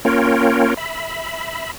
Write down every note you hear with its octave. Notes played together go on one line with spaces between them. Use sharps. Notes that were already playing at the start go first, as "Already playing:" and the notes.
A#3 C#4 F4 A#4 C#5 G5
E5 B5